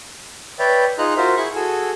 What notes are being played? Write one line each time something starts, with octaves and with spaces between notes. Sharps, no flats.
B4 C#5 D5 E5 G5
D#4 F4 G#4 D#5 A#5 F#6
F4 F#4 A#4 C5 E5
E4 G#4 B5 C#6
F#4 G#4 A4 G#5 E6